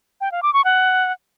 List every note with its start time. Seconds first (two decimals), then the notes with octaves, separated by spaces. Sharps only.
0.21 G5
0.32 F5
0.43 D6
0.54 C#6
0.64 F#5